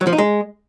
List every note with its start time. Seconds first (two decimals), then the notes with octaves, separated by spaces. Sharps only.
0.01 F#3
0.07 F3
0.13 D#4
0.18 G#3